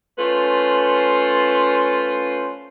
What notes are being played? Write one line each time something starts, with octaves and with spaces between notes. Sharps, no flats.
A3 C#4 F4 B4 C5